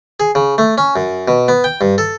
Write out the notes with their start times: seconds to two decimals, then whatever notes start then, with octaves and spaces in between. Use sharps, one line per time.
0.20 G#4
0.35 C#3
0.58 A3
0.78 C#4
0.96 F#2
1.28 B2
1.48 B3
1.64 G5
1.81 G2
1.98 A4